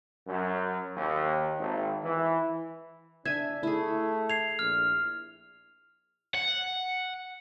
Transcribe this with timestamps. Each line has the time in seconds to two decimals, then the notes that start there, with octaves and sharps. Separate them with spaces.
0.27 F#2
0.97 D#2
1.60 G#1
2.04 E3
3.26 D4 E5 G#5 G#6
3.63 A3 E4 G#4
4.30 G#6 C7 F7
4.59 A#1 F6
6.35 F#5